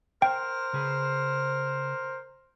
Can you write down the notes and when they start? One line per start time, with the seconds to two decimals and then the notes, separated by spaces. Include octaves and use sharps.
0.22 A#4 C5 G5
0.73 C#3 G#4 B4